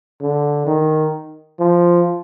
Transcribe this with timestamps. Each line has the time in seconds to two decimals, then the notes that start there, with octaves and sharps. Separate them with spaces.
0.21 D3
0.66 D#3
1.59 F3